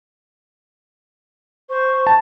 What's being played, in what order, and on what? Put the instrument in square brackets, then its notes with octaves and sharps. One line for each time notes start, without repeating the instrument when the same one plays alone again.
[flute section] C5 C#6
[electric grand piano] A5